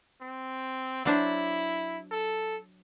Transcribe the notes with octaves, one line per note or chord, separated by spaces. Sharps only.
C4
F#3 D4 E4 C5
A4